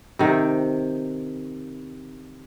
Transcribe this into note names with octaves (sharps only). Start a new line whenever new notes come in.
C3 D#3